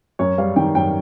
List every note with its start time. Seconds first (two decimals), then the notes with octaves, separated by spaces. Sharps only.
0.19 F#2 C#5
0.38 G3 F5
0.56 D#3 G5
0.75 F#2 G5